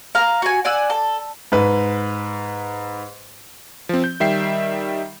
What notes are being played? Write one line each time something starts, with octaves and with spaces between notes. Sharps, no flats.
F5 A#5
F#4 G#5
D5 F#5 G#5 E6
A4
G#2 B4
F3 C4
G6
D#3 G3 E5 G5 C7